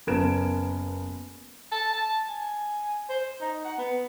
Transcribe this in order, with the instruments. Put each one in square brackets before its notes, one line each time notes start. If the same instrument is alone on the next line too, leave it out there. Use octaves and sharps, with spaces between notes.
[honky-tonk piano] F#1 B3 A#4 G#6 D7 E7
[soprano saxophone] A5
A5
G#5
C5
D#4
F#5
B3